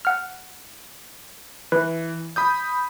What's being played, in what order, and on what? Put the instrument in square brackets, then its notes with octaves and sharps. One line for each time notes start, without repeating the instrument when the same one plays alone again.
[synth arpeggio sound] F#5 F6
[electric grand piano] E3 [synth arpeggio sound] B4
[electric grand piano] B5 D#6 G6